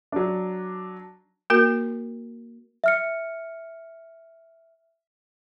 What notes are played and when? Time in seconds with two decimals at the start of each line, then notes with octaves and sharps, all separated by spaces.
0.12 F#3 D4
1.50 A#3 F#4 A#4
2.84 E5 F6 C#7